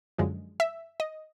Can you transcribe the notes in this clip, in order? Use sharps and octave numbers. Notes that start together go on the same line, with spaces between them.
F#2 D3 F3 G#3
E5
D#5